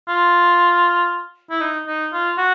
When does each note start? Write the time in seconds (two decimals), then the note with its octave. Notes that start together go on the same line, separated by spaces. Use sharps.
0.08 F4
1.51 E4
1.61 D#4
1.88 D#4
2.13 F4
2.38 F#4